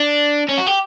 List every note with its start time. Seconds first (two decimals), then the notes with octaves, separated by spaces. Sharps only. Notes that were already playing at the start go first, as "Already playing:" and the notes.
Already playing: D4
0.49 C#4
0.58 F#4
0.67 G4